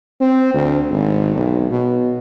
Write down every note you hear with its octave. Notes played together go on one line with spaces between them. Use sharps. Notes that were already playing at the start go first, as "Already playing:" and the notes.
C4
D2
G#1
B1
B2